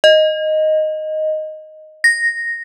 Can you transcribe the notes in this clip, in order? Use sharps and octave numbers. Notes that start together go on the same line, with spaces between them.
D#5
A#6